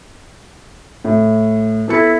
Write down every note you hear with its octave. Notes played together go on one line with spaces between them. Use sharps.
A2
B3 E4 A4 C#7